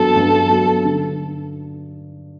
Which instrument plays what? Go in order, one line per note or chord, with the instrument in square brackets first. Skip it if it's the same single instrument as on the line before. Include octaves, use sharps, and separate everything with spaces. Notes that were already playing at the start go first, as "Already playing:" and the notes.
Already playing: [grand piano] G2 F#3 B3 F#4 [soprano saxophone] A4
[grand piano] G2
F#3 B3 F#4
D3